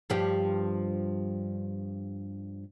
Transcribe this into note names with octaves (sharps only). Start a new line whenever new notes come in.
G2 F3 G4